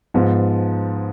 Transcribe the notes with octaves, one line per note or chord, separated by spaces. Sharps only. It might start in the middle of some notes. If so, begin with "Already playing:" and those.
G#2 F3 B3